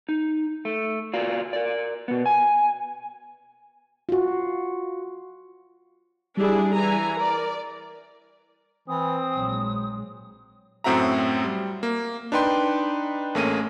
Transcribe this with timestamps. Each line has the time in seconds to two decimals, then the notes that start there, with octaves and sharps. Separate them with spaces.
0.09 D#4
0.65 A3
1.13 F4 F#4 D5 F5
1.53 A#4 D5
2.08 B2 B3
2.26 G#5
4.09 F4 F#4
6.37 G3 D4 E4 G#4
6.75 E3 G#5 A#5
7.17 A#4 D5
8.88 E3 C4 D#6
9.37 A#1 F#3 G#3
10.84 F#2 A2 C4 F#4 E5 A#5
11.44 G3
11.83 A#3
12.32 D4 D#4 B4 G5 C6
13.35 A1 A3 A#3 C#4 G#4 D#7